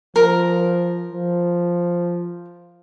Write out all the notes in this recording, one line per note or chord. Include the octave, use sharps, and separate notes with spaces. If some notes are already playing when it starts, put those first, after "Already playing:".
F3 A#4
F3